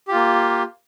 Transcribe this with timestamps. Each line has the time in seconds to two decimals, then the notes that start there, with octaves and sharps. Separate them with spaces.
0.08 G4
0.11 F4
0.14 A#3